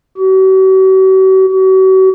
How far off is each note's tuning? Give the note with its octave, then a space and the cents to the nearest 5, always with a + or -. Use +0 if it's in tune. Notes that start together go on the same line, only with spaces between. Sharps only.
F#4 +45
F#4 +40